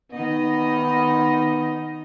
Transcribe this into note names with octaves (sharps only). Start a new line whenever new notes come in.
D#3 B3 D#4 D#5